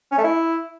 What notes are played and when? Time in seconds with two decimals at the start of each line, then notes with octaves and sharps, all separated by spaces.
0.12 C#4
0.18 A3
0.24 E4